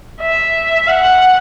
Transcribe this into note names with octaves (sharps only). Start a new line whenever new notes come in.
E5
F#5